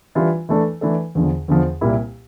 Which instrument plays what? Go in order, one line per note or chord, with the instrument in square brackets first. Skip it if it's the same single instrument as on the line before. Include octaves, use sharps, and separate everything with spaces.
[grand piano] E3 G3 D4 F4
E3 A3 D4 A4
E3 A3 D4 A4
E2 D3 F3
E2 D3 F3
C2 A#2 G3 A#3 E4